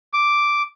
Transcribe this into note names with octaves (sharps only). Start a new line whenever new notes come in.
D6